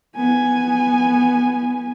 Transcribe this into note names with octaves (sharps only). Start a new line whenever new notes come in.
B3 G#5